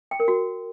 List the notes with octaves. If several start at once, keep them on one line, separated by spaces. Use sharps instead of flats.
G5
A#4
F#4